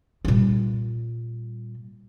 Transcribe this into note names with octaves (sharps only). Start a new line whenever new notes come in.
A#2 G3